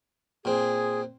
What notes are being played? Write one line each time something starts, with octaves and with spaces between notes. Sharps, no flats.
A#2 C4 G#4